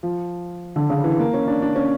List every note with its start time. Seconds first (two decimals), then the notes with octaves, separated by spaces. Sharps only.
0.03 F3
0.76 D3
0.90 C#3
1.04 E3
1.19 A#3
1.34 C#4
1.47 D4
1.62 D4
1.76 C#4